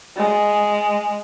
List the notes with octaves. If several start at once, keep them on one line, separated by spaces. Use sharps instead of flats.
G#3